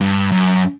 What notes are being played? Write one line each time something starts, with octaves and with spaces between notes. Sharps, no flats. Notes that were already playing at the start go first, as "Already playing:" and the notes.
G2
F#2